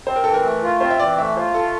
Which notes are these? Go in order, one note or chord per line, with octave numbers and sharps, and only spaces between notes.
C4 C5
A#4
E3 A4
A#4
A3
F4
C4 C5
E5
E3 D5
A3 E5
F4 C5
A3 A4